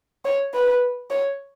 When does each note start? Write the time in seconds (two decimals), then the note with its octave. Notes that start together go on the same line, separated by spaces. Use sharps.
0.25 C#5
0.54 B4
1.10 C#5